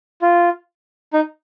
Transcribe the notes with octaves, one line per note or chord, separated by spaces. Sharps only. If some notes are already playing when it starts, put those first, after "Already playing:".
F4
D#4